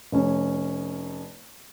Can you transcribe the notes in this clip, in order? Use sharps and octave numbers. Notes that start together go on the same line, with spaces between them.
F1 C#4